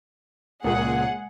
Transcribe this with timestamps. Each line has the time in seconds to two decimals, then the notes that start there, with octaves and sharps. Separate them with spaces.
0.64 C#2 A#2 G#3 G#4 F#5